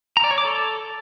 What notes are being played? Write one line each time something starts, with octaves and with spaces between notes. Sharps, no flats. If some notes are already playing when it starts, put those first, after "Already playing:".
A#5
D5
C#5
D6
A4